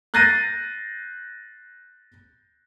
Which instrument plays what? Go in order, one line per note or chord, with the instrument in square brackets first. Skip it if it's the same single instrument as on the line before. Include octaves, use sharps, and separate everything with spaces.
[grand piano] F#6 G6 A6 A#6 C7 D#7